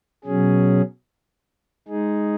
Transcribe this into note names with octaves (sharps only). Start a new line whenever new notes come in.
B2 F#3 C#4 G#4
G#3 D#4 G#4